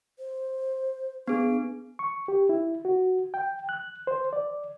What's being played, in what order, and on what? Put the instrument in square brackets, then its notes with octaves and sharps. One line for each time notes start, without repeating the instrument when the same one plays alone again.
[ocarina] C5
[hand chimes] B3 G#4 [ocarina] D4
[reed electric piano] C#6
G4
E4
F#4
G5
F#6
C5
D5